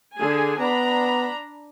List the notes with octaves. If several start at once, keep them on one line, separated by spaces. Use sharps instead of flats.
D3 G#4 G#5
B3 D4 A#5 B5